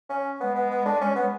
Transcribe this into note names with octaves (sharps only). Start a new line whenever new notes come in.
C#4
G#3 B3
B3
B3
D4
C#4
B3